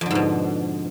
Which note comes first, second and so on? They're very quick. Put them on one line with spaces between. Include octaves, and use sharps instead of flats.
F2 D3 G#2 B2